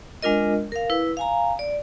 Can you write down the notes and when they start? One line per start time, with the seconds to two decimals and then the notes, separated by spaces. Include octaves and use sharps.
0.23 G#3 D4 F4 A#4 D#5
0.72 A#4 F5
0.90 E4 B4
1.17 F5 G#5 A#5
1.59 D5